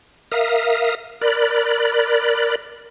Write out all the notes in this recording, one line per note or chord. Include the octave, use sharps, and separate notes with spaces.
A#4 E5 F5 D#6
A#4 D5 B5 F#6